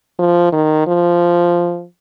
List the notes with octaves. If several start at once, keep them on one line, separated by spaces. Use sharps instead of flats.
F3
D#3
F3